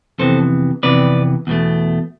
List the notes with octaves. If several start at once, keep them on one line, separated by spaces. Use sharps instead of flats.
F2 C3 E3 B3 A4 C5
F2 C3 E3 B3 B4 D5
E2 B2 A3